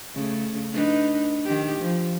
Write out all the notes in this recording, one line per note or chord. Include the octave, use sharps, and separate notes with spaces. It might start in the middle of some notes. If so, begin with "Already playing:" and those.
C#3 A3
D4 D#4 B4
D#3 G4
F3